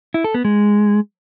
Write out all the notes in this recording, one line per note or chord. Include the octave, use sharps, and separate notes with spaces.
E4
A4
B3
G#3